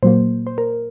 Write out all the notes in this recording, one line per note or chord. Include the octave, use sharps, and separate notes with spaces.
A#2 F#3 A#3 C5
C5
A#4